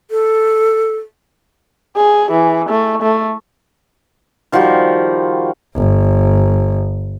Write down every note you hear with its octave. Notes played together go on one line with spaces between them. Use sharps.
A4
G#4
E3
A3
A3
D#3 F3 G3 F#4
G1